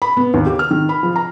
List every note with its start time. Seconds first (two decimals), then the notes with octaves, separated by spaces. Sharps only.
0.02 B5
0.17 B3
0.34 D#2
0.46 G4
0.59 F6
0.71 D#3
0.89 B5
1.03 F3
1.16 A#5